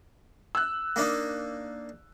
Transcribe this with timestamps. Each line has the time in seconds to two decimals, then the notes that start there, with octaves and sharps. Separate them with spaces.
0.55 E6 F#6
0.96 A#3 D4 D#4